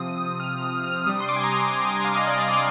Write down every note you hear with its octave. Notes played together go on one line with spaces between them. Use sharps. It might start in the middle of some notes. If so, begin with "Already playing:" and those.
Already playing: C3 F3 C4 D#6
D#6
F6
D#6
F6
C3 G3 D4 D#6
C6
D6
G#5
A#5
C6
G#5
F5
D#5
D5
D#5